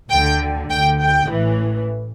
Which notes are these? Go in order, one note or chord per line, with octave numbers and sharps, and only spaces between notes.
D2 D3 G5
D2 D3 G5
G5
A1 A2 E3